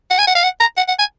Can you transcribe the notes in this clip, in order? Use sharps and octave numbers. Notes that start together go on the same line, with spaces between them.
F#5
G#5
F#5
F5
F#5
A#5
F#5
F#5
G#5